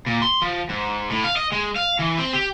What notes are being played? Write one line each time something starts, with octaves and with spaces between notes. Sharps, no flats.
A#2
C6
F3
G#2
A2
F5
D#5
G#3
F5
E3
C4
G4